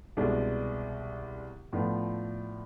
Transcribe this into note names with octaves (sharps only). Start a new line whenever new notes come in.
C2 B2 G#3 D4
A2 F3 B3 D4 F4